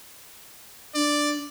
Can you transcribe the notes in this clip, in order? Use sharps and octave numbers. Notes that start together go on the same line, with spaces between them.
D4 D5